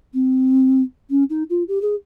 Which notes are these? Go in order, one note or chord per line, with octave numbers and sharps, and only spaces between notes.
C4
C#4
D#4
F4
G4
G#4